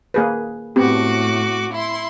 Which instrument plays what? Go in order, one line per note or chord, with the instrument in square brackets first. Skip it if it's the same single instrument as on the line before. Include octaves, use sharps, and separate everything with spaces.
[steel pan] A#3 G#4 B4
[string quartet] A2 F#4 D6 [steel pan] B3 C4 G4
[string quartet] E4 C6